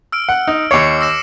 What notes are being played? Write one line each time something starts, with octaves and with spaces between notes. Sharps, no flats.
E6 F6 D7
F#5
D#4
D#2 C#5 D6 C7 C#7
E6 A#6 E7